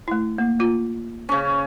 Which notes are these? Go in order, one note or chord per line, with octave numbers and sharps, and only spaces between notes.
A3 E4
A#3
A#3 F4
C#3 C#4